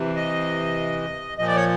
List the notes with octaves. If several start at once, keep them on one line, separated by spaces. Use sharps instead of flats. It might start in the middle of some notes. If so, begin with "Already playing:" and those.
Already playing: C3 E3
D#5
A#2 F3 D#5
D5
C#5